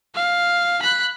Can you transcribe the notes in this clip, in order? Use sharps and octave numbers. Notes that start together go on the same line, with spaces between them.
F5
B5 F#6